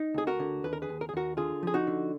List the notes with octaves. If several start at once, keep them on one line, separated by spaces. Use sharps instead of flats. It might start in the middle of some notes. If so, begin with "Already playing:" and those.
Already playing: D#4
D2 G#4
F#4 A#4
D3
D#2 B4
A#4
G#4 B4
D#2
A#4
G#4
D#2 F#4 A#4
D3 F4 G#4
F3 G#4
D#4 F#4
D3